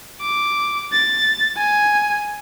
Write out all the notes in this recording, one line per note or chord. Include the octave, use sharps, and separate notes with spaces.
D6
A6
G#5